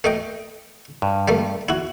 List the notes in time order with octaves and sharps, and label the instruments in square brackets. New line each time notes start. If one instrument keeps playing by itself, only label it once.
[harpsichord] A3 D#5 G5
[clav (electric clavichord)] G2
[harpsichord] G3 A3 A#3
E4 F#4